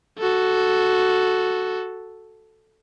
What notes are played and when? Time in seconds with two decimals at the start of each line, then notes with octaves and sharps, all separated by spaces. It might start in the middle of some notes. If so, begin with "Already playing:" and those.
0.19 F#4 A4